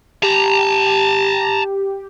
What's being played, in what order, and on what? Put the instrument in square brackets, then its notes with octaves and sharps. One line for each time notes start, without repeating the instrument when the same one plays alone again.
[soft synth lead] G4 [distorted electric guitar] A5 A#5